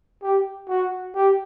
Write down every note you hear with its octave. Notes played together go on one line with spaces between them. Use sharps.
G4
F#4
G4